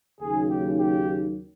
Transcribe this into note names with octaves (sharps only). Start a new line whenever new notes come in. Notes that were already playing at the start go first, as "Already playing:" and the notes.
D#2 C#3 F#3 A#3 D#4 G#4
G4
G4